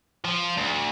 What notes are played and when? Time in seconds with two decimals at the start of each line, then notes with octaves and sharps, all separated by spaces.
0.25 F3
0.57 D2